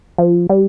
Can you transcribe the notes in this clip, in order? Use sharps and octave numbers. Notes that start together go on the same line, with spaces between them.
F3
G3